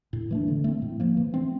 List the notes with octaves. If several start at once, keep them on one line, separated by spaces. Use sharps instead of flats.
A2
E3 A3 D4
D3
A3 C4
A2
F3 A#3
E3
A3 C4